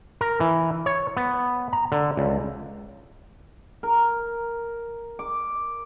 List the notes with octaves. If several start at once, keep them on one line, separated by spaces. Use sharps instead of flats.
A#4
E3
C#5
B3
A#5
D3
C#2
A#4
D6